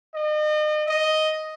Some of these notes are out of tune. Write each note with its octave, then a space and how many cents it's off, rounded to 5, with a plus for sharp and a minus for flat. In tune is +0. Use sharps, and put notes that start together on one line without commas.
D#5 -35
D#5 +5